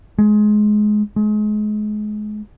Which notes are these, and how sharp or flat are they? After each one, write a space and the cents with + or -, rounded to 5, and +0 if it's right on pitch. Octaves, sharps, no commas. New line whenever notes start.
G#3 +20
G#3 +30